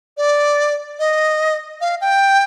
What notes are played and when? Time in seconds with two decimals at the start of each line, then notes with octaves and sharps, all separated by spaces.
0.17 D5
0.99 D#5
1.81 F5
2.01 G5